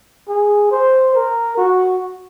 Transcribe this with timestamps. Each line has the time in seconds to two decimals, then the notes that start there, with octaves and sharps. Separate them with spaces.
0.29 G#4
0.71 C5
1.15 A#4
1.58 F#4